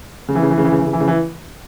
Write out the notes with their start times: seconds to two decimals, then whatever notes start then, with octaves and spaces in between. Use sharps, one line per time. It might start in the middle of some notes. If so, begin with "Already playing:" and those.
0.28 C#3
0.35 E3
0.42 C#3
0.50 E3
0.58 C#3
0.64 E3
0.72 C#3
0.79 E3
0.86 C#3
0.93 E3
1.00 C#3
1.08 E3